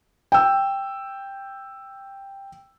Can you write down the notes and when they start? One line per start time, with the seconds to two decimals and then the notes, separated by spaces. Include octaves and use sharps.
0.32 G5 E6